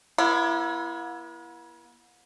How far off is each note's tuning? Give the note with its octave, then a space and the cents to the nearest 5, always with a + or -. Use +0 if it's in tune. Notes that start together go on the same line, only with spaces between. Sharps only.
B3 -45 E4 +25